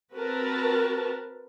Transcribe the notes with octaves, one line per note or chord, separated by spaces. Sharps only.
C4 F#4 A#4 B4 A5